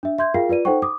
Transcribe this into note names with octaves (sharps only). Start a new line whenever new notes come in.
D4 E5
E5 C6 G6 G#6
F4 G#4 A#4 F5 G5 C7
F4 B4 D5 D#7
D#4 A4 C5 F#5 G5 C#6
D6 D#6